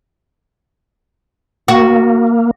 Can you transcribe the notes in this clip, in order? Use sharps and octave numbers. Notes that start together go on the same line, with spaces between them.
A#3 F#4